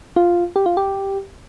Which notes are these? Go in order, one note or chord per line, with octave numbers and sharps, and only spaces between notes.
F4
G4
F4
G4